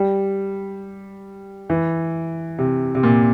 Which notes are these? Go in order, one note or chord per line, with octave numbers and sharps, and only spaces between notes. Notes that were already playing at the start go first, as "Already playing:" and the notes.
Already playing: G3
E3
C3
C3
A#2